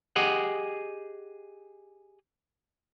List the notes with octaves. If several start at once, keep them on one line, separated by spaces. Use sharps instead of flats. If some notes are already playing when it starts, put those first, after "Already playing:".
G4 G#4 D#5 F#5